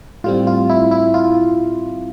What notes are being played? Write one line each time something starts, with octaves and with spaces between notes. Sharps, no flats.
A2 G3 C4 F4
F4
E4
E4
F4